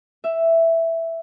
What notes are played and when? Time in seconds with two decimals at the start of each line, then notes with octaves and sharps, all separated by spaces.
0.24 E5